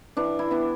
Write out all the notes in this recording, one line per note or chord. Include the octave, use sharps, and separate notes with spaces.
E3 D4
E4
B3 D4